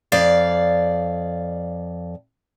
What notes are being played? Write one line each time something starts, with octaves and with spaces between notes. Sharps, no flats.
F2 D5 F5